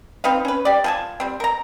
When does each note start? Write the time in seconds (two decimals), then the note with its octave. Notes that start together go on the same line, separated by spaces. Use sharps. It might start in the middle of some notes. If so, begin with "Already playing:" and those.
0.24 C4 D#4 B4 F5
0.45 C#4 B4
0.65 G4 D5
0.84 F3 G#5 A5
1.20 G3 C4
1.40 A#4 A#5